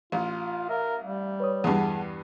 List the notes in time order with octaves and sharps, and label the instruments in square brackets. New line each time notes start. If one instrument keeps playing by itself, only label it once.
[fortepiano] A1 [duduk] F4
[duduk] A#4 [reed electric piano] E5 F5
[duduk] G3
[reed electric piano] B4 C#5 D#6
[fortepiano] E2 G2 [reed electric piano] G#4 F#5 A5